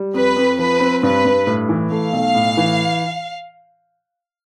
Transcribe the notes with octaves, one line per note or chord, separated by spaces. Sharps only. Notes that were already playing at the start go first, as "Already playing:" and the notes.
Already playing: G3
F2 B4
F2
F3 B4
C4
G2 B4
G2
A2
E3
A3 F5
B1
A2
E3